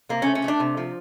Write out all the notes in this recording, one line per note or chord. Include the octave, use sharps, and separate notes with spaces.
C3 A#3
C#4
A3
C#4
A3 D4
C3
F3